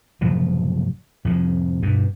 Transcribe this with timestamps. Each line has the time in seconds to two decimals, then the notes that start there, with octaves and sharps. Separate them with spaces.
0.21 F#1 A2 C3 F3
1.25 F2 A2 C3
1.82 G2 B2